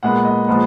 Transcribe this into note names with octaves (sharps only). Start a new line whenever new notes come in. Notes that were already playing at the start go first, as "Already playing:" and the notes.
A#2 G#3 B3 F#5
D#5
A#2 F3 G#3 B3